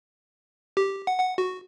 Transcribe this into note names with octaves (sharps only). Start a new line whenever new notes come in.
G4
F#5
F#5
F#4